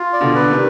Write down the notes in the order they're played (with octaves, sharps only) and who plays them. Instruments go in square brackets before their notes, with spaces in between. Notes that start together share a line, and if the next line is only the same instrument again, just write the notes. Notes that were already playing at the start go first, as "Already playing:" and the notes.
Already playing: [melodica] F4
D5
[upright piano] B2 D3
[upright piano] D3 [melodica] B4
[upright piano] C3 D#3